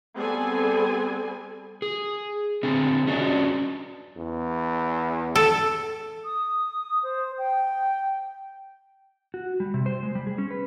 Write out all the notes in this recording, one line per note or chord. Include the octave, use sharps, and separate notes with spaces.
G3 B3 C4 G#4 A4 G#5
G#4
D3 C4 G#4
C#4 D4 F#4 D#5
E2
A4
D#6
C5
G5
F#4
G3
C3
C5
G#3
G3
G#4
C#4
B4